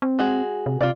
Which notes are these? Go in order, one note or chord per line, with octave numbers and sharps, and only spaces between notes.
C4
G#3 F#4 G#4
C3
C3 F4 D5